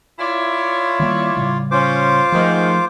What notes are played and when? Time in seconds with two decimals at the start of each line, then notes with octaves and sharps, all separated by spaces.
0.19 E4 F4 C#5 D5
0.99 D#3 G3 A#3
1.37 A2 C#3 G3
1.71 C#4 F4 C5 D6
2.32 G#2 D#3 F3 A3